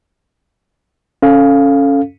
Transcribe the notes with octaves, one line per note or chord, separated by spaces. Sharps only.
C#4 A4 F5